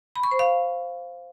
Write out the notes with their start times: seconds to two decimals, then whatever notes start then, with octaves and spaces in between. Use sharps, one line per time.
0.16 B5
0.23 C#6
0.31 C5
0.39 F5